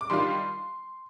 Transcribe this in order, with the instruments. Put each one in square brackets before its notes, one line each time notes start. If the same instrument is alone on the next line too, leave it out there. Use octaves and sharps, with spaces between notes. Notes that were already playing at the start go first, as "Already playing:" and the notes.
[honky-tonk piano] D6
D#3 G3 D4 F4 C6